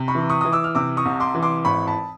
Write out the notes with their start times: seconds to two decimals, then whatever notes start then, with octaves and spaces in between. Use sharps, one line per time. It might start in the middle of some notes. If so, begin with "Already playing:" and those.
Already playing: C3
0.08 B5 C#6
0.15 E3
0.30 C#6 D#6
0.41 E3 D#6
0.52 D6 E6
0.64 F6
0.75 C3 D6 E6
0.97 C#6 D#6
1.05 C2
1.20 C6 D6
1.35 E3
1.42 C6 D6
1.65 G#1 B5 C#6
1.87 A5 B5